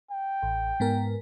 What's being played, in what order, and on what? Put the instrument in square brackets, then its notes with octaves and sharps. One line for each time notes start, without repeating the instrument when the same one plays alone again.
[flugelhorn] G5
[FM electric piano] A1
G#2 B3 A#4